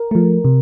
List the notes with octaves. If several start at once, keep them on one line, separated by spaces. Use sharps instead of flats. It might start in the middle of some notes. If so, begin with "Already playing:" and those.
Already playing: A#4
F3 A3
C3